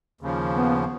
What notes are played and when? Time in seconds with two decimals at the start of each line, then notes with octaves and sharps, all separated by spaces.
0.21 D#2 C#3 F3
0.53 B3